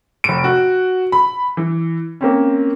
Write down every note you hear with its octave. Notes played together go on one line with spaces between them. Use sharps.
F1 D7
F#4
B5
E3
A#3 C4 C#4